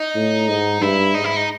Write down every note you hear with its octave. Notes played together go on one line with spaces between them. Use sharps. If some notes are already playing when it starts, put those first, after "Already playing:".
Already playing: D#4
A2
G#2
G2 E4
G#2 D#4
E4
D#4